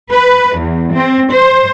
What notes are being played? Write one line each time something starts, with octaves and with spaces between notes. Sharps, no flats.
B4
E2
C4
C5